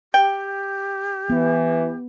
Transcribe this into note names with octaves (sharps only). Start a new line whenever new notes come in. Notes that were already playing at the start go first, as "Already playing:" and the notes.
G4 G5
E3 B3